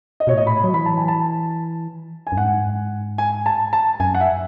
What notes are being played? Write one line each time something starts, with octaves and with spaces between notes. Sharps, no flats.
D#5
B2 C#5
A2 D#5
B5
F#3
E3 B5
A5
G#5
A5
G#5
F#2
G#2 F#5
G#5
A5
A5
F#2 G#5
F#5
E5